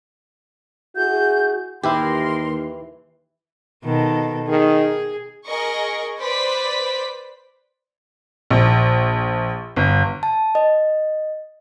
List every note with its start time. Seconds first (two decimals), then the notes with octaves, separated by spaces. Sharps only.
0.96 E4 F#4 G#4 G6
1.84 D#2 E3 E4 G4 A#4 C6
3.83 B2 D#3 A4
4.49 D#3 G#4
5.45 G#4 A#4 D#5 C#6
6.19 B4 C5 D5 B6
8.50 A#1
9.76 G1
10.23 A5
10.55 D#5